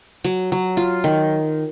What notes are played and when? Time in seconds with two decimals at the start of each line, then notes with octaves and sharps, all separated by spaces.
0.24 F#3
0.52 F#3
0.77 F4
1.04 D#3